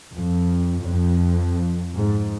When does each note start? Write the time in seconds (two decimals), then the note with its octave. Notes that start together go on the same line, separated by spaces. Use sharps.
0.15 F2
0.87 F2
1.96 G#2